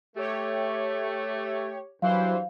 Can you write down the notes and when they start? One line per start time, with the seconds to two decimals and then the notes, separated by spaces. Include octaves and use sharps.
0.16 A3 G4 C#5
2.02 G2 E3 F#3 E4 C5 F5